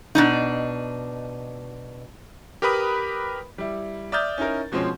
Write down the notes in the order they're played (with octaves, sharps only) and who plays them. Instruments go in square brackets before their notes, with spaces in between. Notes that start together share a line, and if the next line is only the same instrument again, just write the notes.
[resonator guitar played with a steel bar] B2 D4 D#4
[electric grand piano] G4 A#4 B4 B5 D#6
[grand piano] G3 E4
D5 E5 D#6 F6 G6 A6
C#4 D#4 E4 A#4
B2 F3 G#3 C4 C#4